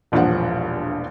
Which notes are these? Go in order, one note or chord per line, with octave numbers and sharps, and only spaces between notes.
E1 A#1 G2 F3 F#5